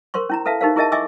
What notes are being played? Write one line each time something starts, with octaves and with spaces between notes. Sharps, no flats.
A#4 C5 C6 C#6
C#4 E4 A#5
A4 B4 E5 F5 A5
D#4 G4 A#4 C5 F5
E4 G#4 A#4 D#5 E5 A5
D#5 E5 G#5 C#6 D6 E6